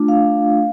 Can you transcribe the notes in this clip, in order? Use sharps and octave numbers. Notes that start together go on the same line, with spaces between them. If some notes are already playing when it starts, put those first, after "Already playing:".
Already playing: A3 D4 F4
F5